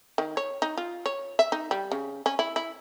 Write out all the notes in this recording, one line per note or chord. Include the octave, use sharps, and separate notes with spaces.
D#3
C#5
D#4
F4
C#5
E5
D#4
G3
C#3
C#4
E4
E4